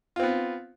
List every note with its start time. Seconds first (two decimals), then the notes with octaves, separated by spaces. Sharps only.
0.16 F4
0.20 C4
0.23 B3